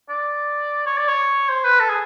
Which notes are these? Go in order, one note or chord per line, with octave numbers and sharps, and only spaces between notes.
D5
C#5
D5
C#5
C5
B4
A4
G#4